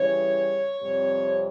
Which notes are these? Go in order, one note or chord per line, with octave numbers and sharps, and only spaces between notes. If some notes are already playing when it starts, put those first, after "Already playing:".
Already playing: C#3 E3 G3 C#5
F2 C3 G3